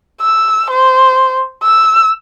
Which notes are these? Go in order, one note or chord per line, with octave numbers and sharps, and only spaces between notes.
E6
C5
E6